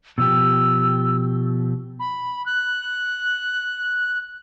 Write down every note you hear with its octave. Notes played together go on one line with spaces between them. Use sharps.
B2 F3 G4 E6
B5
F#6